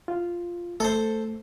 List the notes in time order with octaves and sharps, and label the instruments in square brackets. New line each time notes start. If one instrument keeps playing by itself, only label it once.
[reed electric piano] F4
[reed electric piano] A3 [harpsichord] A4 C5